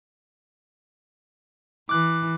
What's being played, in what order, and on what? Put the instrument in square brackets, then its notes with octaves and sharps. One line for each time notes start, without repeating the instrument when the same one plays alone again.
[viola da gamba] E3 [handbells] D6 F#6